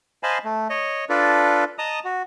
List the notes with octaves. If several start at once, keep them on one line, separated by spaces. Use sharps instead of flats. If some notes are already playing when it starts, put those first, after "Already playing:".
C5 D#5 F5 G#5 A5 B5
A3
C#5 D#5
D4 F4 A4 B4 D5
D#5 A5 A#5 D#6
F#4